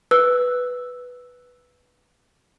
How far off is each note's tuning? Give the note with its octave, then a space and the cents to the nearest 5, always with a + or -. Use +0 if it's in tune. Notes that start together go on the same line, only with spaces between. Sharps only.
B4 +0 E6 +0